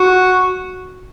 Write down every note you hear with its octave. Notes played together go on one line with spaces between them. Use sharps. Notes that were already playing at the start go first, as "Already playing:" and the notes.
Already playing: F#4